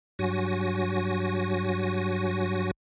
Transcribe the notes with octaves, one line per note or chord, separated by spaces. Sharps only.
G2 F#3 F#4 G#5 A#6